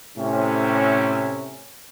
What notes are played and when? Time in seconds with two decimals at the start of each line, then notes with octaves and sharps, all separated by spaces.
0.17 A2 C3 C#4